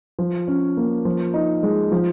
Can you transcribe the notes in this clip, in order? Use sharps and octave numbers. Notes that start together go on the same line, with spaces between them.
F3
C#4
A#3
F3
D#4
G#3
F3